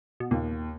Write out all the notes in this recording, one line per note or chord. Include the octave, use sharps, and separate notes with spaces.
B2
D#2 A#2